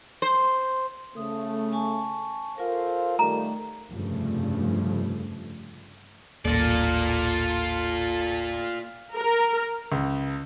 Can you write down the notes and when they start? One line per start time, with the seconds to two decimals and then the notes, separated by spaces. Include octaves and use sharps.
0.22 C5
1.16 C#3 A3 D#6
1.73 G#5 A5 C#6
2.58 F4 A4 A#4 C5 F5
3.19 D#3 G3 A3 A#5
3.90 F1 G2 C#3 F3 A3
6.45 D#1 A1 A#3 F4 A4 D5
9.15 A#4
9.92 C#2